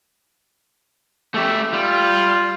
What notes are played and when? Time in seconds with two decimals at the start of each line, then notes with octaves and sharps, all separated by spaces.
1.35 A3 G4 E5
1.73 G3 F4